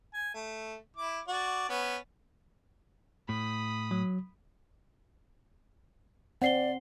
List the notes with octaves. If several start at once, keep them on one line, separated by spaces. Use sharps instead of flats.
G#5
A3
E4 D6
F#4 D5
B3 C#4
A2 B5 D#6
F#3
C4 D5 F#5 C7 G7